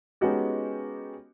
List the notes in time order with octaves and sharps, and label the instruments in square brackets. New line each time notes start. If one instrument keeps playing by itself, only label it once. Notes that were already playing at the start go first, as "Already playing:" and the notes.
[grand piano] G#3 B3 C#4 D#4 F#4 G4